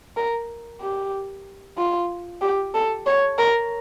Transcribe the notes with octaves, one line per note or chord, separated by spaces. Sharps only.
A#4
G4
F4
G4
A4
C#5
A#4